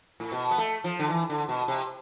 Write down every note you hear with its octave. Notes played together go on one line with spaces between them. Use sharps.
A2
B2
B3
A3
F3
D3
E3
D3
B2
C3